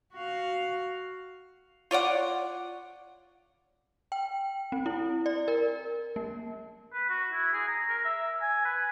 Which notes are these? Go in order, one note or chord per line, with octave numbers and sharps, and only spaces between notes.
F#4 F5
F4 C#5 D5 F#5
G5
C4
E4
D5
A#4
A#3
B4
F#4
E4
G#4
A#5
A#4
E5
G#5
B4